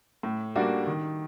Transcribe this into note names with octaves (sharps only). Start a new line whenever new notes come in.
A2
G3 A#3 D4 F#4
D#3